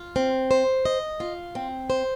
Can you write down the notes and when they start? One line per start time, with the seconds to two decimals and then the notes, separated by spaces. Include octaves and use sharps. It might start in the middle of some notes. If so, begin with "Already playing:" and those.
Already playing: F4
0.16 C4
0.51 C5
0.85 D#5
1.20 F4
1.55 C4
1.90 C5